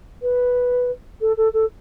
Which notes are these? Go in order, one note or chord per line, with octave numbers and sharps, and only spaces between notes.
B4
A4
A4
A4